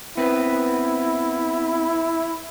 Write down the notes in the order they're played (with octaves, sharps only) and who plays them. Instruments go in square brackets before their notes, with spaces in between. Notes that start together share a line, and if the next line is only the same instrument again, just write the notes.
[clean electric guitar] B3 C4 B4 [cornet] E4